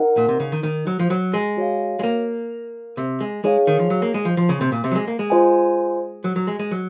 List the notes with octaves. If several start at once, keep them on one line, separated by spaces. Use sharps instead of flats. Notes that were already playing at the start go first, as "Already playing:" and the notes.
Already playing: D#4 A#4 D#5 F#5
A#2
C3
C#3
D#3
D#3
F#3
F3
F#3
G#3
F#4 C#5 F5
G#3
A#3
C3
G#3
G#3 D#4 G#4 C#5 F5
D#3
F3
F#3
A#3
G#3
F3
F3
C#3
C3
A#2
C3
F#3
G#3
A#3
G#3
F4 C5 D#5 G#5
F#3
F#3
G#3
G#3
F#3